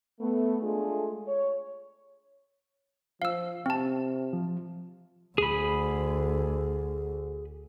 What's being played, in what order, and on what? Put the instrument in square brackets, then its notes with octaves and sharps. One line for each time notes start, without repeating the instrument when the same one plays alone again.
[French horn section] A3 B3
G#3 A3 D4 F4 G#4
C#5
[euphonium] F3 [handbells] F5 E6
[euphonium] C3 [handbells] C4 A5
[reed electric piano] F3
[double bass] D2 [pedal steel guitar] G#4 B5